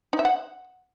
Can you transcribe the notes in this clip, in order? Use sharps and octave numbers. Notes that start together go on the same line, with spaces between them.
D#4
E5
F#5